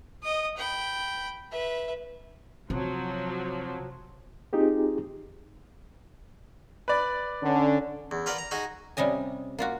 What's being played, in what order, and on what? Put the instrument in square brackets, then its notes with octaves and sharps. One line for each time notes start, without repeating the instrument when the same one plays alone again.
[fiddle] D#5 D#6
G5 B5
B4 E5
[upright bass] C3 [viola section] F3 F#3
[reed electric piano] C4 D#4 F4 G4 G#4
[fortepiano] B4 D5
[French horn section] D3 C#4
[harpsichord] E2
F4 A#4 B4 D5 F#5
A#5
D#4 F#4 G#4 D#5
[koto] C3 G3 C#4 D#5 G#5
A#3 F4 F#4